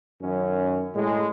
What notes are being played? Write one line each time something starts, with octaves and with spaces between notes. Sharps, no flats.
F#2 D#3 C#4
A2 G#3